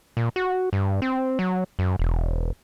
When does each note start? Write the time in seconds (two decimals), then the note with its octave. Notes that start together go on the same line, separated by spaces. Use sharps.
0.17 A#2
0.36 F#4
0.73 G2
1.02 C4
1.39 F#3
1.79 F#2
1.99 E1